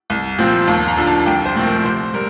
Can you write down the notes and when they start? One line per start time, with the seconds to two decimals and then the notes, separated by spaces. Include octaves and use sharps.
0.10 C2
0.39 A#2 F3 C4
0.67 D#2 A5
0.88 A#5
0.97 D3 F3
1.07 A5
1.26 C2 G5
1.46 C5
1.55 A#2 F3 A3 C4
1.65 A#4
1.84 C3 C5
2.14 G3 A#4